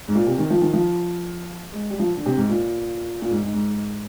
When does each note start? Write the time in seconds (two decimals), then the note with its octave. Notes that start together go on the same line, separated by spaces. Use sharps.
0.08 G#2
0.15 A#2
0.27 C3
0.38 D#3
0.50 F3
0.61 D#3
0.73 F3
1.73 G#3
1.90 G3
1.99 F3
2.17 D3
2.26 C3
2.37 G#2
2.49 A#2
3.22 A#2
3.31 G#2
3.43 G#2
3.54 G#2